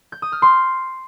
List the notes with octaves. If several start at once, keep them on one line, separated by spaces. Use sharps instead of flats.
G6
D#6
F6
C6